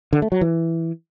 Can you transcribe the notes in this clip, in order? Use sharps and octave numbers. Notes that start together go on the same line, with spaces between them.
D3
A3
F#3
E3